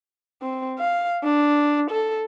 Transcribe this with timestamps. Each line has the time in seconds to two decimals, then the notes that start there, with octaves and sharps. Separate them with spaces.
0.42 C4
0.79 F5
1.23 D4
1.90 A4